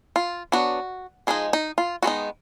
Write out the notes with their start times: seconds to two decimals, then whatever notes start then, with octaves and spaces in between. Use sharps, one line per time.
0.16 F4
0.52 F#3 B3 D4 F#4
1.27 F3 G#3 D#4 G#4
1.53 D#4
1.78 F4
2.02 D#3 G#3 B3 D#4 F#4